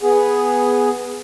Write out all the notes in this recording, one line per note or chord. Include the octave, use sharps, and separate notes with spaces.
B3 G#4